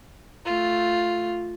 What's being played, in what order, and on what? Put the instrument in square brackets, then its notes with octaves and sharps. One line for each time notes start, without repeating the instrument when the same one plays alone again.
[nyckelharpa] A3 F4